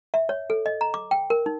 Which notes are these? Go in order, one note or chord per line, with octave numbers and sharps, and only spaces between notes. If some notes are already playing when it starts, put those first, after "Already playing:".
E5
C#5
A4
D#5
A#5
D6
G5
A#4
D#4